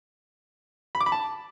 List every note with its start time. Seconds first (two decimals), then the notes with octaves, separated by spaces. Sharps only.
0.95 B5
1.01 D6
1.06 B5
1.12 A5